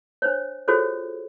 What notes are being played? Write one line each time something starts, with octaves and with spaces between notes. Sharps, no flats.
D4 C5 C#5
F4 F#4 G#4 A4 C5 C#5